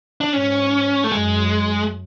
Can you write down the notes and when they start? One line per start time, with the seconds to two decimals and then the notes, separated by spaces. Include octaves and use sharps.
0.21 D4
0.33 G#2 C#4
1.04 A3
1.12 F#2 G#3